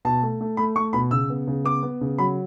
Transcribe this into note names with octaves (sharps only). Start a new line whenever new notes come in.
B2 A5
A3
A3
A3 B5
A3 C#6
B2 B5
C#3 E6
B3
C#3
B3 D6
B3
C#3
F#3 B5